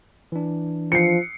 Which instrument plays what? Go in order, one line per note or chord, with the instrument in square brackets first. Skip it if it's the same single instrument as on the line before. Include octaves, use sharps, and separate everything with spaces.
[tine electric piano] E3 D4
[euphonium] F3 [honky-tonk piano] C7 C#7